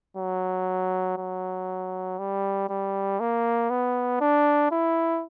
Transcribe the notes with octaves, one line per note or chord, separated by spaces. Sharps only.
F#3
F#3
G3
G3
A#3
B3
D4
E4